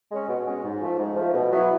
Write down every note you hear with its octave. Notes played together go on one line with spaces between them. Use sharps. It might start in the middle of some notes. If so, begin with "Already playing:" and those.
G#3 C#4
B2
G#3 C#4
G#2
F3 A3
G#2
F3 A3
B2
F#3 B3 E4